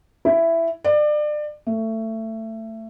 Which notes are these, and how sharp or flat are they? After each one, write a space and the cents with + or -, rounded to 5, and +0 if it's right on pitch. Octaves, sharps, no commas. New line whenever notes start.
E4 +10
D5 +30
A3 +20